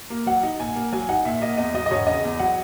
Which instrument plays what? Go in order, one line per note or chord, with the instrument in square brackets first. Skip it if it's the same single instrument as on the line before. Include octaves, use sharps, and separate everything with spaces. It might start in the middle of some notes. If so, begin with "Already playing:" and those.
[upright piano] A#3
[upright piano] F#3 [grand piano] F#5
[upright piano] D#4
[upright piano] A#2 [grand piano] G#5
[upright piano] A#3
[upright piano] F#3 [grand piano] G#5
[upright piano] D#4 [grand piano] F#5
[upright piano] A#2 [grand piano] E5
[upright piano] A#3 [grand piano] D#5
[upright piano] E2 [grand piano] D#5
[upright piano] F#3 [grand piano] D#5
[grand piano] D#5
[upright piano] E1 [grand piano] C#5
[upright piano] C#3 [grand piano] D#5
[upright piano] E2
[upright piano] F#3 [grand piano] F#5